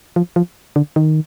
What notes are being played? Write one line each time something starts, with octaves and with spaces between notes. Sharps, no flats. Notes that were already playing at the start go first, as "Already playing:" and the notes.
F3
F3
D3
D#3